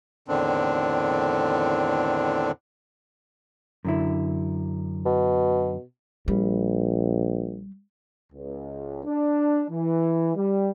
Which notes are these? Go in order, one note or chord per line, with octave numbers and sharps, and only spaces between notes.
E2 A2 D3 D#3 C4 D4
F#2 D3 E4
B2
A#1 G3
C#2
D4
E3
G3